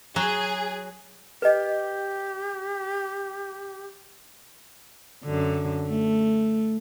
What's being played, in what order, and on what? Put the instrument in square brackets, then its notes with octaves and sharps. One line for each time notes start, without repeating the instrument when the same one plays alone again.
[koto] F#3 [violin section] G#4
[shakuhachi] G4 [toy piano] B4 D#5
[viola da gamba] F#2 D3
A3